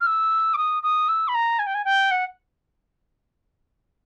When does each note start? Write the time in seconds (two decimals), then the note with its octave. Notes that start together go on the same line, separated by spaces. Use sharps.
0.01 F6
0.07 E6
0.54 D6
0.57 D#6
0.83 D#6
1.09 E6
1.28 B5
1.35 A#5
1.59 G#5
1.67 G5
1.75 G#5
1.85 G5
2.11 F#5